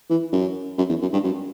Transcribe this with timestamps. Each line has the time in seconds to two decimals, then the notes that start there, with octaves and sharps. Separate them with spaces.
0.10 E3
0.32 F#2
0.78 F#2
0.89 E2
1.02 F#2
1.13 G2
1.23 F#2